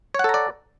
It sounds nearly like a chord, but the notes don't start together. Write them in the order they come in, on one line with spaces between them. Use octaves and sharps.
C#5 F#5 A4 A#5 D5